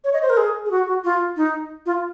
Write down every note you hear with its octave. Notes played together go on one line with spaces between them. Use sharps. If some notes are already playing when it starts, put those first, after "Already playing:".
C#5
D#5
C5
A#4
G#4
G#4
F#4
F#4
F4
D#4
F4